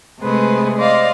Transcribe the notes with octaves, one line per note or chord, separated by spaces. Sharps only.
C3 G#3 A3 G#4 B4 C5
C5 D5 D#5 F5